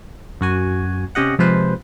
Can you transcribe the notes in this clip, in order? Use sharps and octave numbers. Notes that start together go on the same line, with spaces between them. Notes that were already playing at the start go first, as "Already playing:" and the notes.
F#2 F#4 G#5
C3 C#4 G4 D#5 F#5
C3 F3 G#3 F4 B4 C5